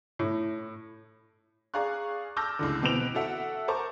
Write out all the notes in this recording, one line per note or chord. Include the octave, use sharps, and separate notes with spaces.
A2
G#4 D5 F5 A#5 C#6 F#6
A5 D6 E6 F6 G6 A#6
C#2 A2 D3
B2 E3 C4 B4 D7 F7
F#4 A4 E5 F#5
A#4 C5 A5 A#5 C#6 D6